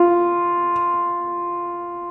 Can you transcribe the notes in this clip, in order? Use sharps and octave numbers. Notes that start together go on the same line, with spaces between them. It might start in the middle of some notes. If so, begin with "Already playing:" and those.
Already playing: F4